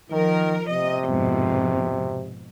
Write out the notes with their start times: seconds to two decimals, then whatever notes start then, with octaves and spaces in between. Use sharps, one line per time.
0.11 D#3 F3 A#4
0.70 C3 D#5
1.07 F2 G#2 B2